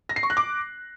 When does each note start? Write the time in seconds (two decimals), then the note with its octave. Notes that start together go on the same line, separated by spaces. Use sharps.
0.09 A#6
0.16 C7
0.23 C#6
0.30 F#6
0.37 D6